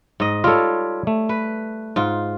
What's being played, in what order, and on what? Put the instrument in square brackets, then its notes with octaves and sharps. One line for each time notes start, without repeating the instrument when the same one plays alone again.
[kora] G#2 D#5
[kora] G3 C#5 [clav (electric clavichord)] F4 A4
[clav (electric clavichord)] A3
[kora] B4
G#2 F4